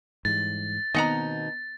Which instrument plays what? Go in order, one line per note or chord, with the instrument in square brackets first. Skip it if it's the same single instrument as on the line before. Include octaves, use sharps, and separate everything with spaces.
[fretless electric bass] G#2 E3 G3 [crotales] A6
[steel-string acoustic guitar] B2 D#4 [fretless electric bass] D#3 A#3 C4 [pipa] D#5 F#5 A#5